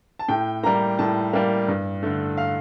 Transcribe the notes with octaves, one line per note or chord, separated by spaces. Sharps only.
A5
A2 G5
G3 A#3 A#5
A2 A5
G3 A#3
G2
D3 A3
F5